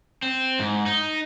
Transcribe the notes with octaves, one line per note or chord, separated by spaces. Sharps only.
C4
G#2
D#4